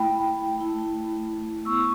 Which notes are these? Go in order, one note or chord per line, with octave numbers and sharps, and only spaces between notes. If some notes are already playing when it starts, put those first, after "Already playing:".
Already playing: A3 E4 G5 B5
A3 E4
B3 E4 C#6 E6